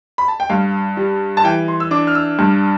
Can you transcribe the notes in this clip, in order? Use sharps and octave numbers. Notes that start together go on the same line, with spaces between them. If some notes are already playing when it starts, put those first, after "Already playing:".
B5
A5
G5
G2 F5
G3
A5
E3 G5
C6
E6
D4 D6
F6
E6
G2